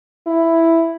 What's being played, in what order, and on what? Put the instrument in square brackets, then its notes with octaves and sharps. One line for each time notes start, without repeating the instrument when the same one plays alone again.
[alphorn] E4